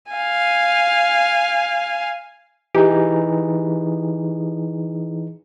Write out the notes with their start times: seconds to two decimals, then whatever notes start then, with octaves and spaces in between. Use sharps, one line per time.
0.12 F5 G#5
2.75 E3 D#4 G4 G#4